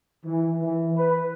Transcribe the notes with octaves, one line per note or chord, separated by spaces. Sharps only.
E3
E3
B4